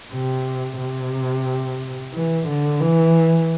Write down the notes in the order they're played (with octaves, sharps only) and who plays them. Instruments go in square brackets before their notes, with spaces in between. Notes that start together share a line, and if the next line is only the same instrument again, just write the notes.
[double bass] C3
C3
E3
D3
E3